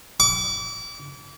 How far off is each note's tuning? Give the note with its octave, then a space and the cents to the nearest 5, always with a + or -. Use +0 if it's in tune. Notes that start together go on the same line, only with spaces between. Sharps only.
D6 -35